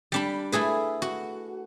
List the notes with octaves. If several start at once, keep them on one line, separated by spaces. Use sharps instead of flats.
G3 D4 B5
A3 E4 G#4 B4
F#4